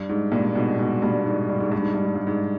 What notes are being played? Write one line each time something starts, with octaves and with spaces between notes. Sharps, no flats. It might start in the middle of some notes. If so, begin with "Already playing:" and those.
Already playing: G2
G#2
G2 A#2
G#2 B2
G#2 B2
G2 A#2
G#2
G2
G#2
G2
G#2
G2
G#2
G2
G#2